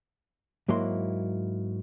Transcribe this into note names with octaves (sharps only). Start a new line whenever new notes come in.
G#2 F#3 A#3 E4 C6